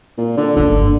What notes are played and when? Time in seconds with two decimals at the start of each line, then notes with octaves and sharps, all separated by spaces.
0.18 A#2
0.37 D3
0.56 C#2 D3 A#3
0.72 G1